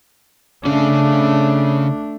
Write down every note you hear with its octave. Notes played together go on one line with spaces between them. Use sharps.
C#3 A3 C#4 D4